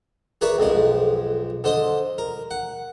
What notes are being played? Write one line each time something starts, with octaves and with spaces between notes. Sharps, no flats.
G#4 A#4 B4 C#5 D5 E5
B1 F2 G#3 G#4
D3 C5 D#5 D#6
A#4
F#5